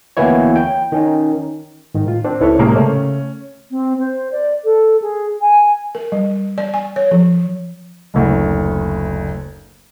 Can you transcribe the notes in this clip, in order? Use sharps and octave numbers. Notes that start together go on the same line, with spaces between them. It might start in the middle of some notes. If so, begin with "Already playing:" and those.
D2 E3 A#3 B3 E4 C#5
G5
D#3 C#4 D#4
G#2 D#3
A2 F4
C4 D4
C#2 C#4 E4 A4 B4 C#5
A2 C3 G#3 A#3
C#3 A3 C#4
C4
C5
D5
A4
G#4
G#5
A#4
G3
D5
G#5
C#5
F3
F#1 D2